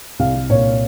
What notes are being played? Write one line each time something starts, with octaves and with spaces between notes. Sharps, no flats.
C2 F5
C2
A#2 C#5